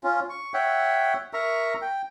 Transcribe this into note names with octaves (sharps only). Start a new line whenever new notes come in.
C#4 F4
C#6
C#5 E5 F#5 G5
A#4 E5 A#5 C#6
G5